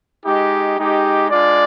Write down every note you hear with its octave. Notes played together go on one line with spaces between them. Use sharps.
G#3 D#4 G4
G#3 D#4 G4
G#3 D4 F4 D5